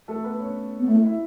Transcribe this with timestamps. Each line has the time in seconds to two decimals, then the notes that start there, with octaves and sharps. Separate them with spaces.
0.08 A3 A4
0.24 B3 B4
0.40 C#4 C#5
0.80 B3
0.88 A3 E4 E5
1.04 E4 E5